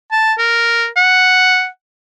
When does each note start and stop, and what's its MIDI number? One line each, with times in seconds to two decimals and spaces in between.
0.12 0.34 81
0.38 0.87 70
0.97 1.67 78